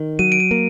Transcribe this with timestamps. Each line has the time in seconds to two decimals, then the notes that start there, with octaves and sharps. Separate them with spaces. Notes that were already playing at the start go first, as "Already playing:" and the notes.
Already playing: D#3
0.19 F#3 D#7
0.32 D7
0.40 D#7
0.51 A#3